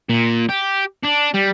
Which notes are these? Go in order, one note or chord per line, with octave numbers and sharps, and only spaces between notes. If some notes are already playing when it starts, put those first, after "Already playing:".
A#2
G4
D4
G3